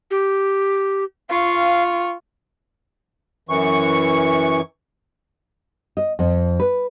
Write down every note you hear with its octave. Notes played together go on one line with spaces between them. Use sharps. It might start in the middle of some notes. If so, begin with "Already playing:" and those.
G4
F4 F5 C#6
F#2 E3 C#6
D#5
F2
B4